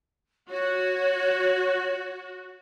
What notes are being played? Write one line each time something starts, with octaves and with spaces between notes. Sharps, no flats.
F#4 C#5